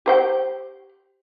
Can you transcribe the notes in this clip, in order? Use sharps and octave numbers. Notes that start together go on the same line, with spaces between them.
G4 C5 G5